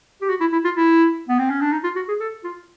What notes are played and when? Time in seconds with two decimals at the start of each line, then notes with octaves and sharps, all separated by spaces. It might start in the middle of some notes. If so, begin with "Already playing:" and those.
0.22 G4
0.29 F#4
0.40 E4
0.53 E4
0.64 F4
0.76 E4
1.29 B3
1.39 C4
1.50 C#4
1.61 D4
1.72 D#4
1.84 F4
1.96 F#4
2.08 G#4
2.20 A4
2.44 F4